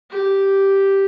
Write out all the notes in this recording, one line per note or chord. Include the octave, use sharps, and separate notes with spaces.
G4